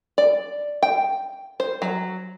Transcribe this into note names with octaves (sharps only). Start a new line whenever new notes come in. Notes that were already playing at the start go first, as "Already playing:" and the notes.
D5
G5
C5
F#3